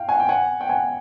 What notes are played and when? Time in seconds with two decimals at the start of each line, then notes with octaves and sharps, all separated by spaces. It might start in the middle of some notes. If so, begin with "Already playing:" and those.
Already playing: F5 G5
0.08 F#5 G#5
0.20 G5
0.29 F#5 G#5
0.61 G5
0.69 F#5 G#5